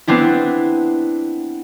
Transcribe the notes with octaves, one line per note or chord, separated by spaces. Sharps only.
B3 C4 D4 E4